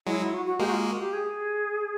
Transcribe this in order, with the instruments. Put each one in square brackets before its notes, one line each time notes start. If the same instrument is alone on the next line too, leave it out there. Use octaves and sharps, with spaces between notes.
[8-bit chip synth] F#3 G#3 [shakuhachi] E4
[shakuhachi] E4
F#4
F#4
[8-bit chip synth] G#3 A#3 [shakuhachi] G4
[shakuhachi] F#4
F4
F#4
G4
G#4